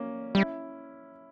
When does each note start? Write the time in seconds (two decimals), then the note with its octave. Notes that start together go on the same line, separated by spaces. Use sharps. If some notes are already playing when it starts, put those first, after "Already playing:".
Already playing: A#3 C#4
0.34 G3 C#4 E4